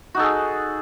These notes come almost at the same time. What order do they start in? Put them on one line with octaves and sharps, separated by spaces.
F#4 D#4 A4 G#4